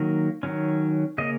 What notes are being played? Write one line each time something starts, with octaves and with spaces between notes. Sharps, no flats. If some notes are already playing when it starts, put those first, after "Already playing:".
Already playing: D#3 F#3 A#3
D#3 F#3 C#4
C#3 A#3 C#4 D#5